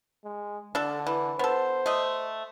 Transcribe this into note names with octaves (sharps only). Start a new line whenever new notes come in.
G#3
D3 D4 A4
E3
B3 A4 C5
A3 D#5